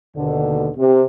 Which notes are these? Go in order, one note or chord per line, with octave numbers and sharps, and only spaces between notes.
D#2 B2 D3
C3